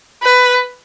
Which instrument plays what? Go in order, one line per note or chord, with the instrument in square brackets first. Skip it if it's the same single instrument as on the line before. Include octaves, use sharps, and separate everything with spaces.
[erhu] B4